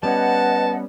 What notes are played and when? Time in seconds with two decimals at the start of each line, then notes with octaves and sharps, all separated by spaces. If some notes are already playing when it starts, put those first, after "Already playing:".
0.03 G3 B3 C#4 B4 D#5 F#5 A5